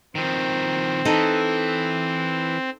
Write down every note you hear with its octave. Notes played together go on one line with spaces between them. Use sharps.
D#3 F3 C4
E3 D#4 A4 D#5